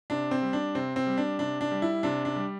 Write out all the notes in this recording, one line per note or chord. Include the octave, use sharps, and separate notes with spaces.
C3 D4
C4
G3
D4
C3 C4
C4
G3
D4
C3 D4
D4
G3
E4
C3 D4
D4
G3